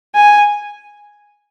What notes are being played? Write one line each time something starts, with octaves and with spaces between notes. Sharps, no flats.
G#5